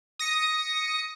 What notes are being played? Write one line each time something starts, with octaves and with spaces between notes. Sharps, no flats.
D#6 A#6 C#7